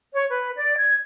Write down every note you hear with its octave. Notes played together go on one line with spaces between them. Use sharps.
C#5
B4
D5
G#6